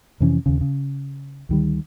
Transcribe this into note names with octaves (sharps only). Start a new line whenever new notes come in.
F2 C3 E3 C#4
D#2 C#3
C#3
D2 D#3 G3